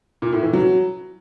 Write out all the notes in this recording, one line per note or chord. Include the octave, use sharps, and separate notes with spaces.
A#2
A2
E3
F#3